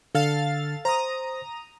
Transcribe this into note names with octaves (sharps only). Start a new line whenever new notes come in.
D3 A4 F5 A6
C5 A#5 D#6